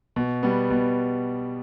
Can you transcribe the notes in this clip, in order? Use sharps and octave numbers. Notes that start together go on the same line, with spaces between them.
B2
G3 B3
B2